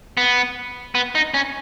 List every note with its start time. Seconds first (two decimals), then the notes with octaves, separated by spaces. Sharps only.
0.17 B3
0.95 B3
1.15 D#4
1.34 C#4